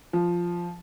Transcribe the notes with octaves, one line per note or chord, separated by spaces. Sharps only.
F3